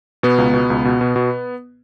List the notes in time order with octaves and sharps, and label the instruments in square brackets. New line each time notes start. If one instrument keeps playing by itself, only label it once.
[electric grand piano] B2 B3
C#2
B2
C#2
B2
B2
B2